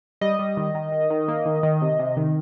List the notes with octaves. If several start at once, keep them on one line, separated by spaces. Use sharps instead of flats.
G3 D#5
G3
D#3
D#3
D#3
D#3
A#3
D#3
D#3
C3
C3
D#3